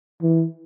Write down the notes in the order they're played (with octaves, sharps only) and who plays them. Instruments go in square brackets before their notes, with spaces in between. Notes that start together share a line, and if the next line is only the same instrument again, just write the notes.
[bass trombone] E3